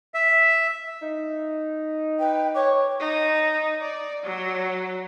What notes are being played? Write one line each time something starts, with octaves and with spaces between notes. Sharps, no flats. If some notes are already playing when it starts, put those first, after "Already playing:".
E5
D#4
B4 G5
C#5 D6
D#4
D5
F#3